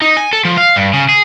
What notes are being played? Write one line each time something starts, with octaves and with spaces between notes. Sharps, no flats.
D#4
G#5
A4
F3
F5
G2
C#3
G#4